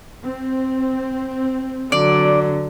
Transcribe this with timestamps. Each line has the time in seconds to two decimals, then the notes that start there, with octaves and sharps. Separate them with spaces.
0.24 C4
1.92 D3 F#3 D5